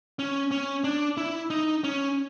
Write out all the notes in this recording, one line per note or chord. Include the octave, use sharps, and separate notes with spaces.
C#4
C#4
D4
E4
D#4
C#4